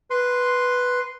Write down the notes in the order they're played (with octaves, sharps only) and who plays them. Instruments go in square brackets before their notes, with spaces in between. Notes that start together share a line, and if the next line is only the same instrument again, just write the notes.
[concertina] B4 C6